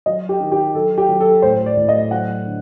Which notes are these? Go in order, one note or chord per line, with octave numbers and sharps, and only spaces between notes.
F#3 D#5
G4
D#3
G4
F#3 A4
G4
F#3
A4
A2 C5
D5
A2
D#5
F#3 F#5
D3